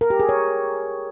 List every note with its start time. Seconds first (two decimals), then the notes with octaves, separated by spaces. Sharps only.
0.01 A#4
0.10 G4
0.20 G#4
0.29 C#5